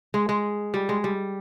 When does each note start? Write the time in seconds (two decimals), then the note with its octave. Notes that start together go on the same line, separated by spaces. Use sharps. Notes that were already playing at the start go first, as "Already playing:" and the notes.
0.14 G#3
0.29 G#3
0.74 G3
0.89 G#3
1.04 G3